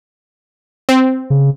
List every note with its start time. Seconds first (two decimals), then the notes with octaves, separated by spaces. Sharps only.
0.89 C4
1.30 C#3